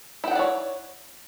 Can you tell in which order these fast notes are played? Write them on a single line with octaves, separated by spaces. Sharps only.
E4 G5 F#5 D5 C#5